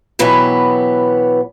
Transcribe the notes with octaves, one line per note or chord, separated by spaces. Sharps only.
B2 E3 F#3 B3 G4